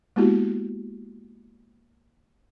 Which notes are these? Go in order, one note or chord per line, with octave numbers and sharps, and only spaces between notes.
G#3 A#3 B3 E4 F#4 G4